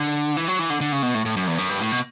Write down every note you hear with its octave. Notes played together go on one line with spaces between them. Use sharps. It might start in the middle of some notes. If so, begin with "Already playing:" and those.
Already playing: D3
E3
F#3
E3
D3
D3
C#3
B2
A2
A2
F#2
E2
F#2
G2
A2
B2